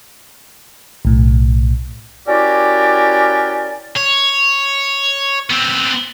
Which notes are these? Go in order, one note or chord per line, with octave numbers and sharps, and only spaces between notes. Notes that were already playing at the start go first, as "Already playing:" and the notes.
B1 A2
C#4 E4 F#4 G4 A#4 D5
C#5
B3 C4